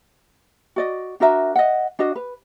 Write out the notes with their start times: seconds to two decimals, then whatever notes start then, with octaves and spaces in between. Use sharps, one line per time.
0.76 F#4 D5 D#5
1.20 D4 F#4 A#4 E5
1.55 D#5 E5 F#5
1.99 D4 F#4 D#5
2.16 B4